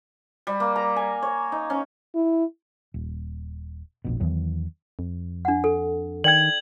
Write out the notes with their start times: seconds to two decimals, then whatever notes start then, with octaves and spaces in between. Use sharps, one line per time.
0.47 G3
0.60 A#3
0.76 A#5
0.96 G#5
1.22 C#5
1.52 D#4
1.70 C#4
2.15 E4
2.94 D#1
4.04 F1 A#1 B2
4.20 E2 D#3 E3 F#3
4.99 F2
5.45 D4 F#5
5.64 A4
6.24 D#3 D5 G5 G#6 F#7